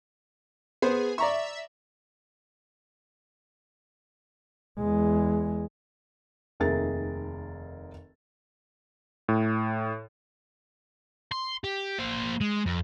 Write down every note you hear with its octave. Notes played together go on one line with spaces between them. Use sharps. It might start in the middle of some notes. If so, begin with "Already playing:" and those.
B3 G#4 C5
D5 E5 A#5 C#6
E2 G#3
F1 D#2 G#4 A#4 E5 A6
A2
C6
G4
A#3 C5
G#3
F2